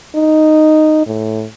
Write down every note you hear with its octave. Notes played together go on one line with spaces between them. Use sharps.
D#4
A2